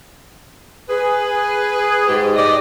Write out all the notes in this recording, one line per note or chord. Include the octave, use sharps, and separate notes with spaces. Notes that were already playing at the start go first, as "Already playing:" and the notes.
G#4 B4
G#2 G4
G4 D5 D#5